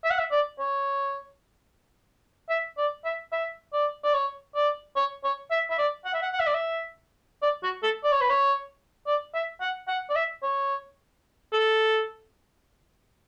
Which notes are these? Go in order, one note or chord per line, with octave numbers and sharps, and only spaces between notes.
E5
F#5
E5
D5
C#5
E5
D5
E5
E5
D5
D5
C#5
D5
C#5
C#5
E5
E5
D5
F#5
E5
F#5
F#5
E5
D5
E5
D5
F#4
A4
D5
C#5
B4
C#5
D5
E5
F#5
F#5
D5
E5
C#5
A4